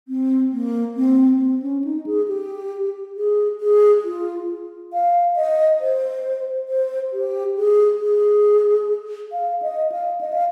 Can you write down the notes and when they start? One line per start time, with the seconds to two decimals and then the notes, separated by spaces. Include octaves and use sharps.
0.08 C4
0.52 A#3
0.96 C4
1.40 C4
1.62 C#4
1.84 D#4
2.06 G#4
2.28 G4
3.17 G#4
3.61 G#4
4.04 F4
4.93 F5
5.36 D#5
5.80 C5
6.69 C5
7.13 G4
7.57 G#4
8.01 G#4
9.32 F5
9.62 D#5
9.92 F5
10.21 D#5
10.32 F5